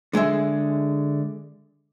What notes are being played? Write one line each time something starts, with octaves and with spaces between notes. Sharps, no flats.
D3 G#3 G#4 E5